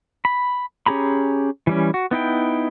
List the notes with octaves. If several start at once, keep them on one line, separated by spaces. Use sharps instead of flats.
B5
C#4 G4 G#4 A#5 B5
E3 G3 C#4
F#4
B3 D#4 E4 G5